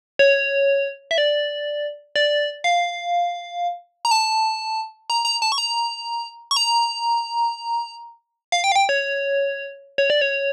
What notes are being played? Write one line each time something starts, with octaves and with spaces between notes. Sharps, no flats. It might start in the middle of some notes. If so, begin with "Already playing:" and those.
C#5
E5
D5
D5
F5
A#5
A5
A#5
A#5
A5
C#6
A#5
C#6
A#5
F5
G5
F5
G5
C#5
C#5
D5
C#5